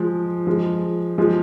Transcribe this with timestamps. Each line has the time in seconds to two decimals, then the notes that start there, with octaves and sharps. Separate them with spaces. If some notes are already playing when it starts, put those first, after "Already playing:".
Already playing: F3 G#3
0.47 F3 G#3
1.18 F3 G#3